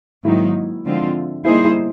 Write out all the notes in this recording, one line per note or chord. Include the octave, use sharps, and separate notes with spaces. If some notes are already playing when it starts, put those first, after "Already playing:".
G#2 D#3 F#3 A#3 D#4 E4
D3 F3 G#3 C4 F4
G3 A#3 D#4 E4 G#4 C5
E4